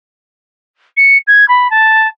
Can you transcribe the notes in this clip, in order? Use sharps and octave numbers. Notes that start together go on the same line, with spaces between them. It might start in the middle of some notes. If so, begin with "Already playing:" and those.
C#7
G#6
B5
A5